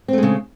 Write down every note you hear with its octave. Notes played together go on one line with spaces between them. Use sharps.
C#3 G#3 A3 C4